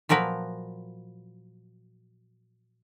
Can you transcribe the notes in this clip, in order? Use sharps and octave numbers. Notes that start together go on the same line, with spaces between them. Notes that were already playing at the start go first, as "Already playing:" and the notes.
A#2 F3 F#3 A#4 B4